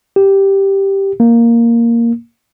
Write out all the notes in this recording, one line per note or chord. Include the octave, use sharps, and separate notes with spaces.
G4
A#3